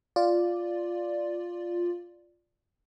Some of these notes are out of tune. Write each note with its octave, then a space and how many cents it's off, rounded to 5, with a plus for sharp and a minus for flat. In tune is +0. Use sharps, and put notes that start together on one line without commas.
F4 +0 D5 +0